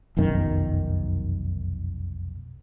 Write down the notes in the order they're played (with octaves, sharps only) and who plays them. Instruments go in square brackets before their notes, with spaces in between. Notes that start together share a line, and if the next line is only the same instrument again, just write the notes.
[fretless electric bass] F1 B1 F#2 D#3